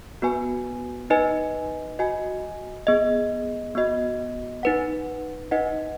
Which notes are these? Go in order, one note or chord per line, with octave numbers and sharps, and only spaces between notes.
B3 F#4 B4 G#5
D#4 B4 D#5 G#5
F#4 D#5 G#5
B3 G#4 D#5
B3 F#4 D#5
D#4 B4 F#5
D#4 B4 D#5 F#5